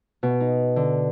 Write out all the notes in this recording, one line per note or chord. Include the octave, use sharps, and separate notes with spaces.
B2
D#4
D3